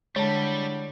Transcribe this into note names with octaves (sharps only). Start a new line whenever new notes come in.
D3 G3 G#3 E4 C#5 A5